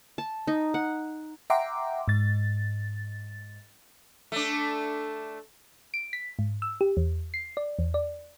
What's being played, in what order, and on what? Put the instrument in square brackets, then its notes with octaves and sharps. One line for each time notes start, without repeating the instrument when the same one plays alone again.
[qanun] A5
D#4
F#5
[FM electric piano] E5 F#5 G5 A#5 C6 D6
G#2 A6
[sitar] A3 D4
[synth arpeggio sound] D7
B6
G#2
E6
G4
E2
C7
D5
E2
D5